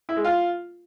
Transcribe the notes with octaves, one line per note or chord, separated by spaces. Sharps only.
E4
G#3
F4